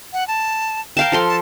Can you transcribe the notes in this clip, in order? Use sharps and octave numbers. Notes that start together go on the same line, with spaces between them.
F#5
A5
A#4 F5 G5 A5
F3 A4 C6
A5